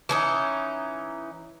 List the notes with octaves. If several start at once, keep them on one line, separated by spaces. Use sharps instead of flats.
E3 C#4 D#4